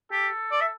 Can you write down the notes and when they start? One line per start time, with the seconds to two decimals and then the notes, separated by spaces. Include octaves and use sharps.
0.11 G4 A4
0.51 D5
0.61 E5